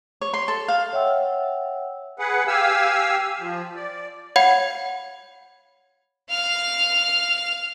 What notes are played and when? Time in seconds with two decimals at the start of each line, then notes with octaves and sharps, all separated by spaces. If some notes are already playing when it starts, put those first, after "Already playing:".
0.21 C#5
0.34 C6
0.48 A4
0.68 F5
0.93 C#5 E5 F#5 G5 E6
2.19 G#4 B4 F#5
2.47 G4 F5 G#5 E6
3.40 F3
3.75 D5
4.36 C#5 F5 F#5 B5 G#6 C7
6.30 F5 F6